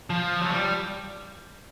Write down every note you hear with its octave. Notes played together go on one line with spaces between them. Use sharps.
F3
F#3
G3